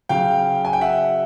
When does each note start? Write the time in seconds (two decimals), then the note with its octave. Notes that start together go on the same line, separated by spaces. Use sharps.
0.09 C#3 F#3 F5 G5
0.65 G#5
0.73 G5
0.81 E5 F#5